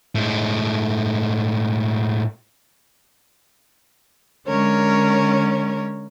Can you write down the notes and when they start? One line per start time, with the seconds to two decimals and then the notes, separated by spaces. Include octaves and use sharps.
0.15 A2 G#3
4.46 D3 G#3 C#4 A#4 C#5